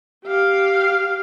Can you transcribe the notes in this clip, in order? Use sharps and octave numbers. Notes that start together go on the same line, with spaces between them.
G4 F5